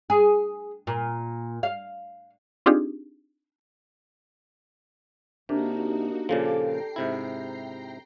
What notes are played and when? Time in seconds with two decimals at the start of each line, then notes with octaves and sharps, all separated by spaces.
0.10 G#4
0.87 A#2
1.63 F5
2.66 C4 D4 D#4 F4 G4 G#4
5.49 C3 A#3 D4 D#4 F#4 G4 A#4
6.29 A#2 C#3 F3 G4 A4 D5 D6
6.61 G5 A#5 C7
6.96 G#2 C3 E4